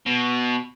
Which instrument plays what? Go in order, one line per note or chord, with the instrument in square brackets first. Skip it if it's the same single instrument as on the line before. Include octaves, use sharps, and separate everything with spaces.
[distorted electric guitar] B2